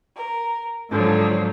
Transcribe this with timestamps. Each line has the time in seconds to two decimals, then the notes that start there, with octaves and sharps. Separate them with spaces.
0.16 A#4
0.89 G#2 D3 F3 F#3